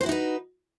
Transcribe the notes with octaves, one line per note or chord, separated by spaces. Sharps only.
D#4 E4 F#4 B4 C5